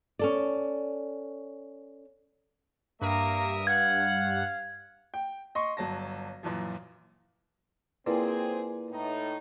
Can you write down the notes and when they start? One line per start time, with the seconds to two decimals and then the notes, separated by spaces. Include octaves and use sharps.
0.19 C#4 A4 D5
3.02 G2 A#3 A#4 E5 D#6
3.67 F5 F#5 G#6
5.14 G5
5.55 D#5 C6 C#6
5.77 G1 F#3 A5 A#6
6.43 F#2 A#2 E3 F3
8.07 A#2 C4 E4 G#4 B4
8.91 A2 D#4